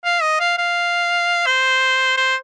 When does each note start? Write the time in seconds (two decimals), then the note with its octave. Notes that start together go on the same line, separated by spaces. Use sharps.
0.04 F5
0.22 D#5
0.40 F5
0.58 F5
1.46 C5
2.17 C5